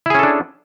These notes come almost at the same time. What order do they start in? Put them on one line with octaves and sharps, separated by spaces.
E4 G#4 C#4 A4 D4